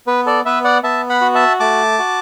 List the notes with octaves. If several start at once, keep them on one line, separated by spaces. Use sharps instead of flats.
B3 B4
A4 D5
B3 B4 E5
D5 F#5
B3 E5 A5
F#5 B5
F#4
E5 A5
A3 A5 D6
F#4